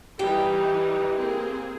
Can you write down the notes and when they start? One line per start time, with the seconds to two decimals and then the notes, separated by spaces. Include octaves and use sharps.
0.19 E3 G3 D#4 G4
1.17 A#3 C4 G#4